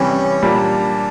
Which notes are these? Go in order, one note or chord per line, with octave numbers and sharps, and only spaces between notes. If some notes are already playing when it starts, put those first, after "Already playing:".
Already playing: C3 E3 G3 C#4
A#2 G3 A#3 D4